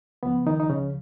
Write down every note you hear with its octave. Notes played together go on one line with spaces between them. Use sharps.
C#2 C#3 F3 B3
D#3 D#4
D#4
C#3 C#4